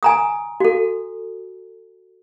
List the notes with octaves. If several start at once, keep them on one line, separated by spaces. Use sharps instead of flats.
G#5 A#5 D#6
F#4 A4